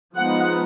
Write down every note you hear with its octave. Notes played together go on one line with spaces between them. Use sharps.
F3 G#3 B3 D#4 F#5